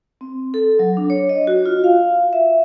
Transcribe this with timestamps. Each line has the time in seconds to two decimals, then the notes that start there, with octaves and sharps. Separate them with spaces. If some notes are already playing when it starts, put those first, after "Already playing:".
0.21 C4
0.54 A4
0.79 F#3
0.97 D4
1.10 C#5
1.29 D#5
1.47 F#4
1.66 F4
1.84 F5
2.33 E5